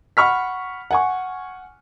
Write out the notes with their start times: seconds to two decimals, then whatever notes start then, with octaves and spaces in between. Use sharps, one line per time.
0.17 F#5 B5 C#6 F6 B6
0.91 F#5 G#5 C#6